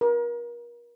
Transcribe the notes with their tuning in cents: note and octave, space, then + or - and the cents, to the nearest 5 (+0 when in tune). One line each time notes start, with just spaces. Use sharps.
A#4 +35